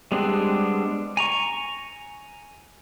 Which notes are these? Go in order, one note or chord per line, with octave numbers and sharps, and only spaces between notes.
G3 G#3 B3 C4 D4
G#5 A#5 C#6